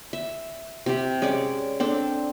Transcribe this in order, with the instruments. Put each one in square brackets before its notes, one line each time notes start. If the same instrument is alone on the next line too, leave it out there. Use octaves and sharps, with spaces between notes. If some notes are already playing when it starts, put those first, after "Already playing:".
[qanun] E5
C3 G4
G#3 C#4 C#5 D5
C4 D4 A4